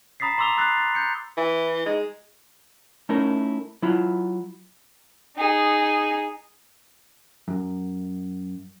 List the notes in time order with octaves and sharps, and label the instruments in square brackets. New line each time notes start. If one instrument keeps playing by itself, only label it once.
[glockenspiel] A#5 B5 D#6 A6 B6 C7
A#5 C6 D6 E6 F7 G7
B5 D#6 E6 F#6 A6 C7
A6
G6 C#7
[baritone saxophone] E3 [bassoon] E4
[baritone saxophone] G#3 [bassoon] D#4
[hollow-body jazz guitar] A3 C#4 D#4 E4 A#4
F#3 E4 F4
[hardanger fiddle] D#4 G#4
[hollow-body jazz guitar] F#2